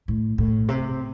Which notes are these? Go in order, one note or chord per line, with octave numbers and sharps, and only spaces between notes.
A2
A2
C3